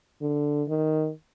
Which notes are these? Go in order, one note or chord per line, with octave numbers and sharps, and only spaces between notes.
D3
D#3